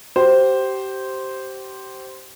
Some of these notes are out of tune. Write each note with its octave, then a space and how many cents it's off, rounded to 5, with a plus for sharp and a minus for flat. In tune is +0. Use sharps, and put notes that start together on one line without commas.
G4 -25 C5 +0